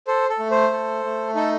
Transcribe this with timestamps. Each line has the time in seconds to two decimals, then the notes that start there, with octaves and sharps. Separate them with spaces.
0.07 A4 C5
0.29 A4
0.39 A3
0.51 C5
0.72 A4
1.04 A3
1.35 D#4 A4